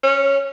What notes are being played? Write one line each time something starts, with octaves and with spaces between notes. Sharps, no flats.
C#4